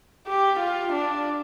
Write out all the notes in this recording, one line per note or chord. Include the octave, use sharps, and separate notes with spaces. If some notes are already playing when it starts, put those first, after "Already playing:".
G4
F4
D4